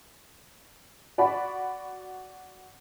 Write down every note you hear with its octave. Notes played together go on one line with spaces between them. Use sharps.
F#4 D5 B5